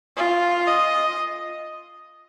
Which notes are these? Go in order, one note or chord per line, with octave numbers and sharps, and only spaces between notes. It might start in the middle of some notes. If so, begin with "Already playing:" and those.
F4
D#5